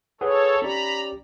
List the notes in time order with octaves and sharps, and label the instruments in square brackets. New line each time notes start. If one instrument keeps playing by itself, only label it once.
[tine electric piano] G#4 B4 F#5 [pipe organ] A4 C#5
[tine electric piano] C#4 G4 D5 [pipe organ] A#5 B5